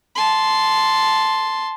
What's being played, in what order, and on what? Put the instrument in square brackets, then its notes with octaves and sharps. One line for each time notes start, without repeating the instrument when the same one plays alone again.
[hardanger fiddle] A5 C6